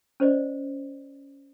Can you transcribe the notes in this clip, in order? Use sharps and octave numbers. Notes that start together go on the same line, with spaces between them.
C#4 C5 D5 D#5